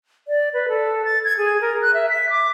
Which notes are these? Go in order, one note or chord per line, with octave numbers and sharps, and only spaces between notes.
D5
B4
A4
A6
G#6
G#4
A#4
F#6
E5
B6
D6